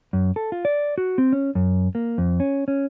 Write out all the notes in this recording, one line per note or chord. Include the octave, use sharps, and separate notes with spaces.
F#2
A4
F4
D5
F#4
C4
C#4
F#2
A#3
F2
C#4
C#4